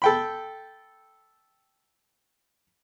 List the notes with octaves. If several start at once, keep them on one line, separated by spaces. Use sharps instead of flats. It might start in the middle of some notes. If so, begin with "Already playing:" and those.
A4 G5 B5